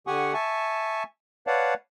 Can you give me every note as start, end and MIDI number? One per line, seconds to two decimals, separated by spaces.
0.07 0.34 50
0.07 0.34 67
0.07 0.34 78
0.07 0.34 80
0.07 0.34 85
0.07 0.34 87
0.34 1.03 76
0.34 1.03 80
0.34 1.03 81
0.34 1.03 85
1.47 1.74 71
1.47 1.74 73
1.47 1.74 74
1.47 1.74 77
1.47 1.74 78
1.47 1.74 81